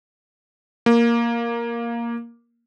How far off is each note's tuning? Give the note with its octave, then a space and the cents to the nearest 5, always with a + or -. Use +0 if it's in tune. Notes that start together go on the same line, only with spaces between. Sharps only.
A#3 +5